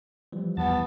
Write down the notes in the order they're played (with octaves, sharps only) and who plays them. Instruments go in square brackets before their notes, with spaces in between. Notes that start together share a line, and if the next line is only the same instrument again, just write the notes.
[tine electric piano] E3 F3 G3
[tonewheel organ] E2 A5 [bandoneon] B3